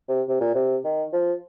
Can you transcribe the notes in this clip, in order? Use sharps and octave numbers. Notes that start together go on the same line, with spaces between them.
C3
C3
A#2
C3
D#3
F3